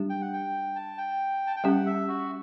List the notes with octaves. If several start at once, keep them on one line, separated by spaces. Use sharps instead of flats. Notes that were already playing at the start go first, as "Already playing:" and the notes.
Already playing: G3 D4 G4
G5
F#5
G5
A5
G5
A5
G5
G3 C#4 G4 F#5
E5
F#4